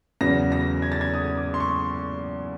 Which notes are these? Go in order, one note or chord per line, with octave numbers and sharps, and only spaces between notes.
E2 C#3 F#3 B3 A#6
A#6
G#6
A6
G#6
D#6
D6
C6
C#6